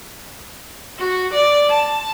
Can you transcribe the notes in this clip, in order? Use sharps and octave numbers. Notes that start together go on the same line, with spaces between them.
F#4
D5
A5